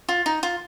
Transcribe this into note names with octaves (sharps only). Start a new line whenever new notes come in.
F4
D#4
F4